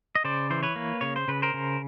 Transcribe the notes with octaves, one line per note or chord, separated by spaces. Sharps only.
D#5
C#3 C5 D5
E3 C5
B4 C#5
A#3
C#3 C#5
C5
C#3 B4
A#4 C5
C#3